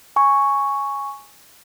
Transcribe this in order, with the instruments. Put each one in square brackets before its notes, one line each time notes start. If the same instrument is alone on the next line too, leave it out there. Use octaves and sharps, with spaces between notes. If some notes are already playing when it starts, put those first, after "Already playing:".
[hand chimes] G#5 C#6